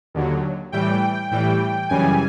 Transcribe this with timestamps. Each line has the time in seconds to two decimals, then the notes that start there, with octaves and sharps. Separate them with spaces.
0.14 D#2 D3 F#3
0.72 A2 E3 G3 G5
1.31 A2 E3 G3 G5
1.89 F#2 C#3 E3 G3 G#5